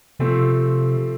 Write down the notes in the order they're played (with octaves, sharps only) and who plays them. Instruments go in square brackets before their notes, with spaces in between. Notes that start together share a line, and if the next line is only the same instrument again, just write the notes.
[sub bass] C3 [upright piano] F3 A3 C4